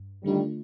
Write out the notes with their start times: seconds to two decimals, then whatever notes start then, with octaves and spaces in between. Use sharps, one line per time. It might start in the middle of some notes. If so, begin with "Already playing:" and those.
Already playing: G2
0.24 D3 D#3 G3 A3 D4 F4